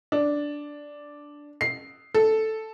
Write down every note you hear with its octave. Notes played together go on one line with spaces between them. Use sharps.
D4
C7
A4